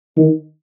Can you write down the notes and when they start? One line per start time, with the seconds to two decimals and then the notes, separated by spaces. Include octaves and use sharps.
0.17 D#3